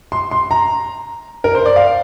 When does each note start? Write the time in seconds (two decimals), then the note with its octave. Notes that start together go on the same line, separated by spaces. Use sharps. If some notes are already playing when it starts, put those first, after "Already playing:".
0.12 C6
0.31 C6
0.51 A#5
1.44 A#4
1.55 C5
1.66 D5
1.76 F5